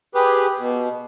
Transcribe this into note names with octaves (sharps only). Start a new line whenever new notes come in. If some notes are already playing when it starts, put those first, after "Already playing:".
G4 G#4 B4
B2